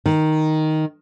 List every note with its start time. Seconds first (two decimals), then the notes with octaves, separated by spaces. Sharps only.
0.06 D#3